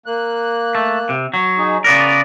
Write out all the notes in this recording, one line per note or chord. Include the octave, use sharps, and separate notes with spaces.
A#3 F#6
A3
C3
F#3
D#4 G#4
C#3 B3 A#4 D5